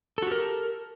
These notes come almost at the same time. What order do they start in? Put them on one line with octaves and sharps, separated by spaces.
A4 F#4 G4 A#4